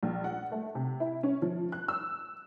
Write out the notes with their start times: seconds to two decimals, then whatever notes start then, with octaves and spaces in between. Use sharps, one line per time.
0.03 A#1
0.24 F#5
0.52 A3
0.75 C3
1.00 E4
1.23 C#4
1.42 F3
1.72 F#6
1.88 E6